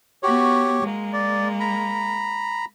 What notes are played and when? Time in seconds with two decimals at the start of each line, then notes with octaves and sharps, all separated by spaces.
0.23 B3 F#4 G4 C#5
0.81 G#3 A#3
1.13 D5
1.60 A#5 B5